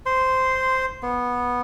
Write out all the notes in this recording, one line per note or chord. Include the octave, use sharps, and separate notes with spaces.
C5 C6
B3